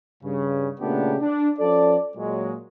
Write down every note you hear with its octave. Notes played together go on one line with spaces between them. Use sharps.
G2 C#3
A#2 C#3 A3 B3 D4 G4
D4
F3 C#4 A4 D5
A#2 F#3 G#3